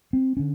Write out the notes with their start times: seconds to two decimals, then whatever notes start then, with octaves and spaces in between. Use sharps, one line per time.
0.13 C4
0.37 D3 C#4